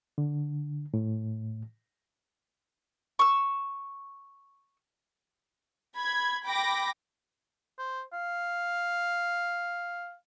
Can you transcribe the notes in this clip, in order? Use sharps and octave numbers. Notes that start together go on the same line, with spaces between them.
D3
A2
C#6 E6
B5 G#6
G5 B5 D6 A#6
C5
F5